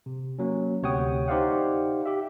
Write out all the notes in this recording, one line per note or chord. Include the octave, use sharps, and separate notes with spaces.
C3
F#3 A#3 C#4
D2 C3 C#5 F#5 G5 D#6
D#4 G4 C5 D5 F5 F#5
G4 E5